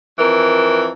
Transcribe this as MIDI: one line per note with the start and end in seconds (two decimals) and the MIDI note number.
0.19 0.89 41
0.19 0.89 52
0.19 0.89 70